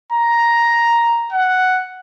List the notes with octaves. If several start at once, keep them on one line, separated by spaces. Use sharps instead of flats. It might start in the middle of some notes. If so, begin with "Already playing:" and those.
A#5
F#5